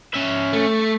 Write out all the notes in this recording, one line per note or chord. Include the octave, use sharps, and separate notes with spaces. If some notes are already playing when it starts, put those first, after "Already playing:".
C#4 E5
A3